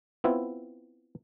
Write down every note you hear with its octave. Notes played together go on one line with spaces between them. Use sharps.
B3 C4 E4 F4